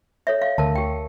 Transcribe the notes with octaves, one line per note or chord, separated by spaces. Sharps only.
A4 C#5 E5
F5
D2 A#4 A5
G4 G5